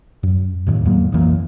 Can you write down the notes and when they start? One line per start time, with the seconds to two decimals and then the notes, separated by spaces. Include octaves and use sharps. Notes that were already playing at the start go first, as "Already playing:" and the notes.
0.23 F#2
0.67 D#2 A2 D#3
0.85 E2 G#2 F#3 A#3
1.12 A#1 F2 E3 A#3